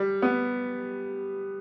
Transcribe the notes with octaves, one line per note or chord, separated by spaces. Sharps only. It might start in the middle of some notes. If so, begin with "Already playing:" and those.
Already playing: G3
B3